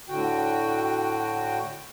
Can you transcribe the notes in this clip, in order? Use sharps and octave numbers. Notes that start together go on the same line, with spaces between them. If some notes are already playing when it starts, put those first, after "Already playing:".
A2 D3 F#4 G5